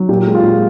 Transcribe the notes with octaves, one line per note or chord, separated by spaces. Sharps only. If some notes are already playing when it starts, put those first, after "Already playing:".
Already playing: F#3
A#2 G4
G#3
F4
A#2